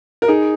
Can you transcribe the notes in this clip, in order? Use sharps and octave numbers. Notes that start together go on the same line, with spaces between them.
A#4
D#4 G#4